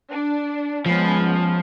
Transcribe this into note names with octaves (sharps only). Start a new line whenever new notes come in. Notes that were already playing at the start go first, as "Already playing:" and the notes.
D4
F3 G#3 B3 C#4